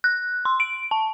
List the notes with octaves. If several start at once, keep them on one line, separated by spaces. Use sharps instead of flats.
F#6
C6
D7
A5